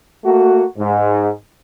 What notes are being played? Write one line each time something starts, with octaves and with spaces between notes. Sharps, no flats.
A3 A#3 F#4
G#2